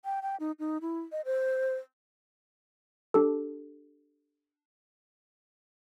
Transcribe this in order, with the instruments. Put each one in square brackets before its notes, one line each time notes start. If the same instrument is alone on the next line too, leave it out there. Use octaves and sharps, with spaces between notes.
[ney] G5
G5
D#4
D#4
E4
D#5
C5
[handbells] D4 G4 A4